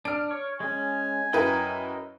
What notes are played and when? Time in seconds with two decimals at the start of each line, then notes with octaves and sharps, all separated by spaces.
0.05 D4 F6 D7
0.31 C#5
0.60 G#3 C#4 G#5
1.33 F#2 E4 A#4 B4 D#5 G5